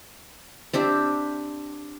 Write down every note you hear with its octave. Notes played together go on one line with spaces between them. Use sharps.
C4 D4 G4 E5